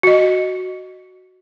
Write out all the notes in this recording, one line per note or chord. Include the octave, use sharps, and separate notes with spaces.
F#4 D#5